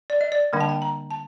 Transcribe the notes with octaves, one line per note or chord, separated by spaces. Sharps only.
D5
D#5
D5
D3 G3 A#3 D4 G5
A5
G5
A#5
A5